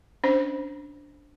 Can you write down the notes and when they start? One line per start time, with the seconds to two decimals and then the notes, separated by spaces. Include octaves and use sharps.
0.24 C#4 D4 C5